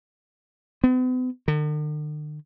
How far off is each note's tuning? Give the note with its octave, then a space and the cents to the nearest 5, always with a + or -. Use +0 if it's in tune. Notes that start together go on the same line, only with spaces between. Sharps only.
B3 +45
D3 +45